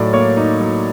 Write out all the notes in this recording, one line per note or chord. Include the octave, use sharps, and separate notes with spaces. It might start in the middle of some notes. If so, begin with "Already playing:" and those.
Already playing: A2 F#3 D#4 D5
A#3 C#5
D#4
F#3